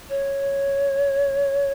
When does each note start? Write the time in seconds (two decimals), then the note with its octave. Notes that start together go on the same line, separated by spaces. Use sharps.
0.09 C#5